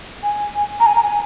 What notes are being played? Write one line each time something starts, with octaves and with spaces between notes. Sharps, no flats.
G#5
A#5
G#5
A#5
G#5